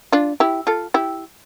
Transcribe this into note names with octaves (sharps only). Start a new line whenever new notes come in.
D4 F4
E4 G4
F4 A4
E4 G4